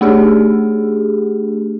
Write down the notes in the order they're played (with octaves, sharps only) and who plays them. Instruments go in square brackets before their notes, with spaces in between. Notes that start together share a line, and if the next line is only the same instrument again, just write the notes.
[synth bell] A3 D4 G4 G#4